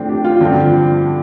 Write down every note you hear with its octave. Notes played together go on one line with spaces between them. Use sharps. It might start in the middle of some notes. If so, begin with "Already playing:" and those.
Already playing: A2 F3 C4 D4 A4
G4
F4
G2 D3 F3 C4